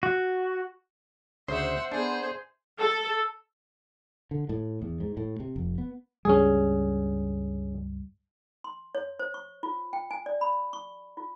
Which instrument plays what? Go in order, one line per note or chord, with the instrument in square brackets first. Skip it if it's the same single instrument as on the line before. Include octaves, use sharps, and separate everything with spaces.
[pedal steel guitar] F#4
[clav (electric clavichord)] D2 C#3 [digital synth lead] C5 [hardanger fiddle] E5 F#5
[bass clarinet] B3 [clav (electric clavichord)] D4 [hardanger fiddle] G#4
[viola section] A4
[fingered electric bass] D3
A2
E2
G#2
A2
C3
F1
B3
[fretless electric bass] C#2 G2 G3 [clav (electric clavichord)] C#4 G#4
[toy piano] C6
C#5
C5
C#6
F4
G5
G#5
D5
B5
C#6
F4